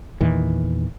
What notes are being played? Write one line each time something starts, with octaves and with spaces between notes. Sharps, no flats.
E2 A#2 D#3 E3